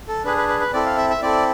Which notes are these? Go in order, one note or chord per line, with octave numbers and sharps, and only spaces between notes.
A4
D4 G#4 B4
B4
B4
B4
C4 E4 A4 D5
F5
E5
E5
C4 E4 A4 D5